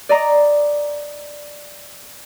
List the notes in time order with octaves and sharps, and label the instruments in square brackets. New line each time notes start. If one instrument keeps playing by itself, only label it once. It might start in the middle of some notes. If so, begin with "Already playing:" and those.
[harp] D5 D#5 A#5 D6